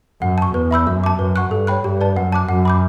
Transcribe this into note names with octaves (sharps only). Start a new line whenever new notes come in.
F#2 F#5
A5 C#6
E2 B4
E5 B5 E6 G6
F#2 E5
A5 D6
F#2 B4
F#5 C#6 F#6
G2 A4
C#5 G5 B5 F#6
G2 G4
B4 D5 A5
F#2 F#5
A5 D6 F#6
F#2 F#5
B5 D6 G6